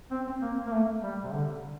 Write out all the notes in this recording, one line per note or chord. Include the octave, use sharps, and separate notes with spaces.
C4
C4
A#3
A#3
A3
G3
C3
D3